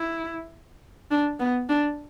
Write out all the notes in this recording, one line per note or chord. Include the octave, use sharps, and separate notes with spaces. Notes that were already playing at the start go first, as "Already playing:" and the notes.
Already playing: E4
D4
B3
D4